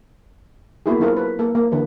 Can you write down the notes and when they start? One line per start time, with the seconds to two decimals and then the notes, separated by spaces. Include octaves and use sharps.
0.86 A#3 B3 E4 F#4 G#4
1.00 F#3 C4 E4 F4 A4 A#4
1.17 C4 B4
1.39 A#3 A4
1.55 A#3
1.72 D3 E3 B4